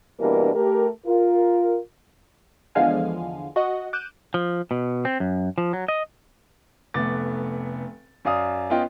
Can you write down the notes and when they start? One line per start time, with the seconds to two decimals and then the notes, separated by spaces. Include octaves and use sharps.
0.19 G2 B2 E3 A#3 D4 A#4
0.54 A3 G4 A#4
1.06 F4 A#4
2.75 E2 D3 F3 G#3 F5 G#5
3.56 F#4 D#5 F#5
3.93 D6 F#6 G6 D#7 E7
4.34 F3
4.71 B2
5.05 C4
5.20 F#2
5.58 F3
5.73 F#3
5.88 D#5
6.94 F1 A3 B3 D6 A6
8.25 F#2 D5 F5 D#6
8.70 B3 C#4 F4 D#5 G5